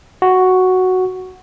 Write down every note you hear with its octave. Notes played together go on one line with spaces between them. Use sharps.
F#4